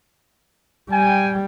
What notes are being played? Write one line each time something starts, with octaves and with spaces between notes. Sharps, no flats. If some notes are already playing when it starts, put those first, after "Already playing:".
G3 G5 G#5